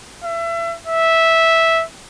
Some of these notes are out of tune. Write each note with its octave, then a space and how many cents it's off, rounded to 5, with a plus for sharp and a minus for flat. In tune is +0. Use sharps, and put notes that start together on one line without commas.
E5 +30
E5 -10